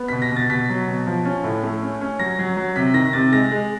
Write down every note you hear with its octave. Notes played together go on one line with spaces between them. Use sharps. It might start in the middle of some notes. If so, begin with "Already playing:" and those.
Already playing: B3
B6
B2
A#6
B2
A6
B2 B6
F#3
B2
F3
C#4
A2
A3
C#4
C#4
F#3 A#6
F#3
F#3
C3 B6
D#3 A#6
C3 A6
G#3 A#6
G#3